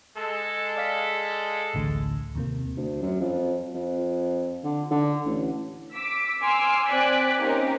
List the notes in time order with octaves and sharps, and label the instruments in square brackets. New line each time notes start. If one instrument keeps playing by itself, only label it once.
[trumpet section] G#3 A4
[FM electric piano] D5 F5 B6
A1 D2
D#2 C3 A#3
[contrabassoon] D2
F#2
F2
F2
D3
D3
A1
[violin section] D6 E6 B6
G#5 C6 D6 E6 F6
C4 D5 G#5 D6 F#6 B6
A#3 C4 C#4 D#4 G4 A#4